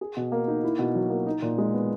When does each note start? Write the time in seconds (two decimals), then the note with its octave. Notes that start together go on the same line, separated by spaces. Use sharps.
0.01 G#4
0.17 B2
0.32 A#3
0.48 D#4
0.64 E4
0.79 B2
0.95 F#3
1.10 A#3
1.26 D#4
1.42 A#2
1.58 G#3
1.73 B3